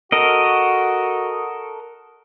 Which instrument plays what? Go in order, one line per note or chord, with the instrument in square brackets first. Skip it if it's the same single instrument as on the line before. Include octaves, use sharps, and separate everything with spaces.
[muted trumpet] F#4 [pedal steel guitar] A4 A#4 D#5